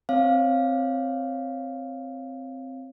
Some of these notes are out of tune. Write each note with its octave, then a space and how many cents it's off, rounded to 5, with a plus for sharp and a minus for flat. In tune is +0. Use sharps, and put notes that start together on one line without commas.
C4 +0 C#5 +0 F5 +0